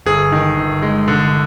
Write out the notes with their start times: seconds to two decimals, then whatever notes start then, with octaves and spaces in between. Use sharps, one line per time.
0.06 G1 G#4
0.32 D#3
0.57 G1
0.82 G#3
1.08 D3